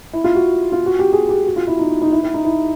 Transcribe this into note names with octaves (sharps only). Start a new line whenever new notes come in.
E4
F4
F#4
F4
F#4
G4
G#4
G4
F#4
F4
E4
D#4
D#4
E4
E4
D#4
E4